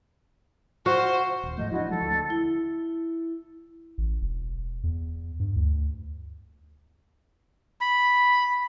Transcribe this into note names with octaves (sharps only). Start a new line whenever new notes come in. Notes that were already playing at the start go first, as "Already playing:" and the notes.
F#4 C5 F5
D#1
G#2 F3 A3 D#5 G6
F3 D4 E4 F#4 D#5
F3 G#3 A4
D2
E4
A1
E1
E2
G2
D2
B5